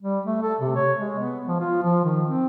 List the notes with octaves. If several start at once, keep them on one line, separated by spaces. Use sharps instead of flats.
G3
A3
A4
C3
C#5
G#3
B3
F3
F4
F3
D#3
C4